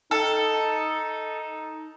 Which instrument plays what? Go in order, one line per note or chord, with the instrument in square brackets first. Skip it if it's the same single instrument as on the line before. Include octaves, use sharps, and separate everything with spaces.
[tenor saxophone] D#4 [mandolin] A4